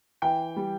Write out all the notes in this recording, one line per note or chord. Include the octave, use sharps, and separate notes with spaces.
E3 G5
G3